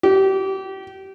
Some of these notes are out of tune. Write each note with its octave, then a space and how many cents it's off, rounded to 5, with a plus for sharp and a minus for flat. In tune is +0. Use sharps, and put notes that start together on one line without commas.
G4 -30